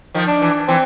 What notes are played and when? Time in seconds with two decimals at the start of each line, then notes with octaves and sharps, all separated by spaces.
0.14 D#3 F3
0.27 D4
0.42 E3
0.68 E3 C4